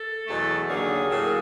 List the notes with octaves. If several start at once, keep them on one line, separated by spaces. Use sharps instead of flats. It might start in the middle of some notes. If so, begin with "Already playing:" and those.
Already playing: A4
E2 B2 F#3 A3
D#2 D3 F#3 A#3 G#4
A2 F#3 A#3